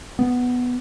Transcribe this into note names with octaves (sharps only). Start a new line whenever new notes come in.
B3